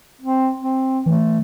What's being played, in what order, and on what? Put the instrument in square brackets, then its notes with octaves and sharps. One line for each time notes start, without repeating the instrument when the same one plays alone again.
[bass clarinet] C4
C4
[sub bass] E3 [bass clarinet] A3